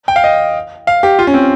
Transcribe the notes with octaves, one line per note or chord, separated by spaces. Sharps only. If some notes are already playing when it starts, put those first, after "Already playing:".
G5
F5
D#5
F5
G4
F4
C#4
C4